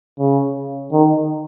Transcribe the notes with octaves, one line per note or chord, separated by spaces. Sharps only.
C#3
D#3